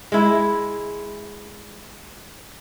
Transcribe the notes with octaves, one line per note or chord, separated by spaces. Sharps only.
G#3 E4